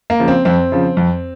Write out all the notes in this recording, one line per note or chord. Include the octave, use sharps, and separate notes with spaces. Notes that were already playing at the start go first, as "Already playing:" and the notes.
A#3
C#3 F3
C4
F2 C4
C#3 F3
F2